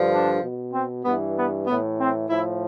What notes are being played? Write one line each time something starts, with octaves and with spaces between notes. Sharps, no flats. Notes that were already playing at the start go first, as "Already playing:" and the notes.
Already playing: G2 D3 F3
D4
B2
C4
G2 E3 B3
B3
A2 E3 B3
C4
A2 F3 E4